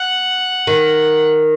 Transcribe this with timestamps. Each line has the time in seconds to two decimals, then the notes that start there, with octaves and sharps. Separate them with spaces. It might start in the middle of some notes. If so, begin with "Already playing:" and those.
Already playing: F#5
0.67 D#3